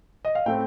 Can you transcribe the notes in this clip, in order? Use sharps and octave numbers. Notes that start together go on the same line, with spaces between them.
D#5
F5
A2 A3 C4 G5